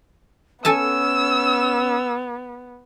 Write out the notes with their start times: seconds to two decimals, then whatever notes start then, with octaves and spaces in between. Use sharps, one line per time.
0.65 B3 C#4 A4 G#5 A5 E6